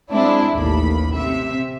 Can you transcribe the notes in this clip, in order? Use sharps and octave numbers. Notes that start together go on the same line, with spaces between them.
G#3 C4 D4 E4
A1 D#2 B5
C3 E5